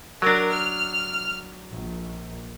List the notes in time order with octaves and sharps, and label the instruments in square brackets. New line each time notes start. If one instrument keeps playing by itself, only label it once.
[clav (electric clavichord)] F#3 D4 [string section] A#4
[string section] F6
A#1